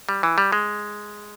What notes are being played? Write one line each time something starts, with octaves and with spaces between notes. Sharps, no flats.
G3
E3
G3
G#3